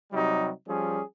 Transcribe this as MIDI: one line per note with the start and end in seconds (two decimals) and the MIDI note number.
0.12 0.50 48
0.12 0.50 54
0.12 0.50 55
0.12 0.50 63
0.66 1.01 53
0.66 1.01 55
0.66 1.01 61
0.66 1.01 68